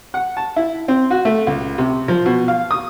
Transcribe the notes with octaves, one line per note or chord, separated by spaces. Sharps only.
F#5
A5
E4
C4
F#4
A3
C#2
C3
F3
B2
F5
D#6